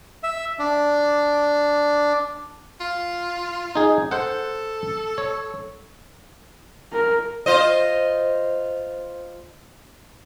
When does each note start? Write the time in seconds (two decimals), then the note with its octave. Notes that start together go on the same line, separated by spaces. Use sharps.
0.23 E5
0.59 D4
2.80 F4
3.75 D#4 G#4
4.11 A4 C5 F#5
5.18 C#5
6.93 A#4
7.46 F4 C5 D#5